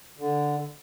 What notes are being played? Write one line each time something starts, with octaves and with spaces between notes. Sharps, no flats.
D3